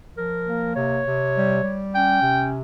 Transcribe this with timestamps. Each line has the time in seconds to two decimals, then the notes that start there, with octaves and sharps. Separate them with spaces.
0.17 F3 A#4
0.46 A#3
0.76 C3 C#5
1.05 C3
1.35 G3
1.64 G3
1.93 C#4 G5
2.22 C3